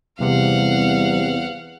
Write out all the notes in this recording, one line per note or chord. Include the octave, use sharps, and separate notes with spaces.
E2 C3 G3 F5 F#5